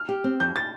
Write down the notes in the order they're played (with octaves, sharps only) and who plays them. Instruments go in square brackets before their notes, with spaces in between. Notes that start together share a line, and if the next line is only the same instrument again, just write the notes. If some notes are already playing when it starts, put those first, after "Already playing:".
Already playing: [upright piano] F6
[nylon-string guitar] G4
C4
[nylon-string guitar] F2 [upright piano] G6
[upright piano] A6